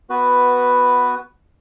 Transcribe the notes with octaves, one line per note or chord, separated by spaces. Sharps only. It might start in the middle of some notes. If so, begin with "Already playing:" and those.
B3 F#4 B4